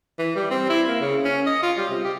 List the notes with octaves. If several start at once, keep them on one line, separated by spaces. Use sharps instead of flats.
E3
G3
C4
E4
A#3
C#3
C#4
D#5
F4
G3
C3
G4